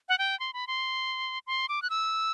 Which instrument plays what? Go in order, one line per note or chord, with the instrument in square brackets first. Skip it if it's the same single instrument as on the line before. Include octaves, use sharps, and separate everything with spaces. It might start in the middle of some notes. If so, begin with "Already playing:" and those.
[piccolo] F#5
G5
C6
B5
C6
C6
D6
F#6
E6